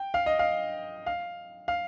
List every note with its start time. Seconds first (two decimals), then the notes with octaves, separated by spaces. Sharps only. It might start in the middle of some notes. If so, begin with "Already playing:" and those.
Already playing: G5
0.14 F5
0.26 D#5
0.39 F5
1.06 F5
1.68 F5